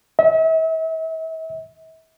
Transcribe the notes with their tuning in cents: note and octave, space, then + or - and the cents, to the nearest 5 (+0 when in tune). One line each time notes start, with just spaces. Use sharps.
E5 -40